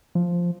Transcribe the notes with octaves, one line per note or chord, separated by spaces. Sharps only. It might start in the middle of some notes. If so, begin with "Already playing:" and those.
F3